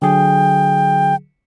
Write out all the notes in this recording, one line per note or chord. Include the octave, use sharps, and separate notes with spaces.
D3 F#3 G#4 G5